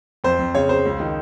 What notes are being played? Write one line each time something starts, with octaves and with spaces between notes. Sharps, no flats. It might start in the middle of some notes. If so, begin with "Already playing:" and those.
F2 C5
F2
C#3 C#5
C#3 C5
C#2
D#3